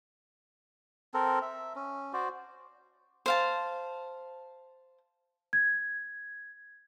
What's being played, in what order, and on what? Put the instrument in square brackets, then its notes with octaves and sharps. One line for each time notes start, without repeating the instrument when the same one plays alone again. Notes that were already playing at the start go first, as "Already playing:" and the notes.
[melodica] C4 A4 A#4
E5
C#4
F#4 C5 D5
[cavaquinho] C5 F5 A5
[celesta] G#6